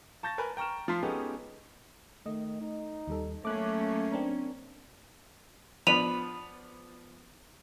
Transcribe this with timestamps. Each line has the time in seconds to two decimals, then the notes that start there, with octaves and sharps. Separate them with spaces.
0.23 A5 C#6 G6 A6 A#6
0.38 A#4 B4 G#5 B5
0.57 G5 A#5 C#6 F6 E7
0.88 F3 F4 A5 C6 B6
1.03 G#3 B3 C#4 D#4 G4 A4
2.26 D#3 A3 D#5
2.61 D#4
3.08 D#2 G3 A4
3.45 F#3 A3 A#3 C#4 D6 F#6
4.12 C4 D4 A#4
5.87 F3 B3 D4 B5 D#7 F7